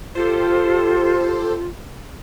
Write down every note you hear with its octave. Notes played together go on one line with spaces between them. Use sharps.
F4 G4 A4 C5